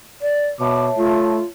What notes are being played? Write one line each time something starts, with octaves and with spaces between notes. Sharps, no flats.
D5
B2 C#5 E5 A5 D6
A3 F4